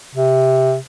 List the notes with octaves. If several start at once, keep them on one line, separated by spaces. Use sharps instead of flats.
C3